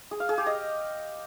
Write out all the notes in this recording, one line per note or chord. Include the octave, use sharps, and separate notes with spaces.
G#4
F5
G#4
G4
D#5